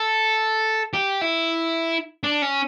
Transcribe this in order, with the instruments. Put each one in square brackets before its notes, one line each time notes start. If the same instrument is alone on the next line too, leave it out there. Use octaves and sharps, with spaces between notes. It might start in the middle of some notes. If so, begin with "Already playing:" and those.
Already playing: [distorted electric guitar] A4
G4
E4
D4
C#4